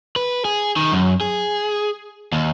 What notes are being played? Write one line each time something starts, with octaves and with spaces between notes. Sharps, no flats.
B4
G#4
D#3
F#2
G#4
D#2